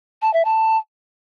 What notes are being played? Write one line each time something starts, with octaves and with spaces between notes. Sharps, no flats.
A5
E5
A5